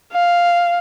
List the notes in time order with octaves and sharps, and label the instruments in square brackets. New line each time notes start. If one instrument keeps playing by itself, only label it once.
[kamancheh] F5